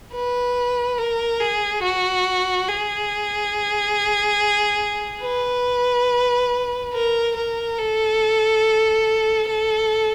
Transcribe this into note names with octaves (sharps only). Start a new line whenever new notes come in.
B4
A#4
G#4
F#4
G#4
B4
A#4
A#4
A4
A4